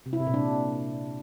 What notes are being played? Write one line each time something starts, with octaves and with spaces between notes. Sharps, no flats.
C3
E4
C3
A#2
D4